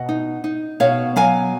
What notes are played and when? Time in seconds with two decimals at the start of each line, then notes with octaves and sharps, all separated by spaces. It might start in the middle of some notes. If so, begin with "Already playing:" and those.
Already playing: B2 D#5 F#5
0.09 D#4
0.44 D#4
0.80 B2 C#5 F5
1.16 F#3 F5 G#5